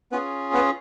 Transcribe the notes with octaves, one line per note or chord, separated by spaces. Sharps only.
B3 C#4 F4 G#4 B4
B3 B4